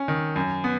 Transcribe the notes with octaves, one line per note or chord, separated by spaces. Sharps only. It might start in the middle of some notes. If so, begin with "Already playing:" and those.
Already playing: C#4
D#3
F#2
B3